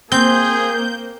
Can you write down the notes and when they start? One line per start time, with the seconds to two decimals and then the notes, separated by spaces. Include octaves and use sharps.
0.12 A#3 C4 G#4 G6